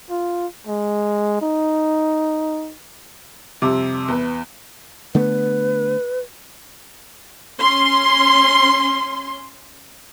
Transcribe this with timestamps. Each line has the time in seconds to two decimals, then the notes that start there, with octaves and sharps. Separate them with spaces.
0.10 F4
0.67 G#3
1.42 D#4
3.62 F2 C3 G3 D6
4.08 E2 B4
5.15 D3 A3 B3 B4
7.61 C#4 C6